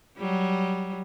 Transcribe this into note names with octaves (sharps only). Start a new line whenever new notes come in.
F#3 G3